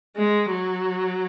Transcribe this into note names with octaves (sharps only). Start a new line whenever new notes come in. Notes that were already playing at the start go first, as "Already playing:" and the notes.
G#3
F#3